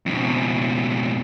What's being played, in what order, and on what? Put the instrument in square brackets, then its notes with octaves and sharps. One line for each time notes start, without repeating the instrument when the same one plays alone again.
[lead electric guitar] F2 B2